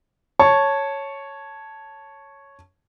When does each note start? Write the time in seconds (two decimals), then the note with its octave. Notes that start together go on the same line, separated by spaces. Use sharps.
0.39 C#5 A5 C#6